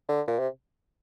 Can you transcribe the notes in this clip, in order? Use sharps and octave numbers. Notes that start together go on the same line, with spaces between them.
D3
A#2
C3